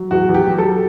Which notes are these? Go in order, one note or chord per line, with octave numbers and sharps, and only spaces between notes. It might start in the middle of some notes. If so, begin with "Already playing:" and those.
Already playing: F#3
E2 F#4
E2
G4
F#3
A4